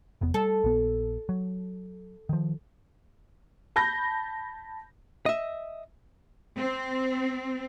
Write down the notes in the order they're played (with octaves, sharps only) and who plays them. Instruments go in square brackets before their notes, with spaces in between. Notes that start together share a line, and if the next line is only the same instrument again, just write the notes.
[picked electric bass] F1 E2 B3
[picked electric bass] G3 [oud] A4
[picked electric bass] A#1 B3
F#3
D#3 F3
[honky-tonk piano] A5 B5 G6 A#6
[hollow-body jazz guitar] D#5 E5
[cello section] C4